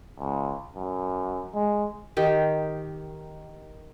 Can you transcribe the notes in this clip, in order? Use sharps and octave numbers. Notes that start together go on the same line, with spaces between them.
C#2
F#2
G#3
D#3 G4